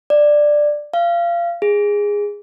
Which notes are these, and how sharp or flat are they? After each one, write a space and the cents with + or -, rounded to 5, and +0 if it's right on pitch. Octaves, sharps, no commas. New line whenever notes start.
D5 +10
F5 -25
G#4 -15